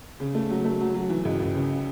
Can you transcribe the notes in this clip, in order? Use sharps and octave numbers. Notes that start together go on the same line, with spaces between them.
C#3
A3
F#3
A3
F#3
F#3
E3
C#2
C#2
C#3